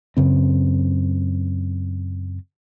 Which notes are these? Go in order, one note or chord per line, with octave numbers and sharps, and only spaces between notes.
F#2 C#3 C4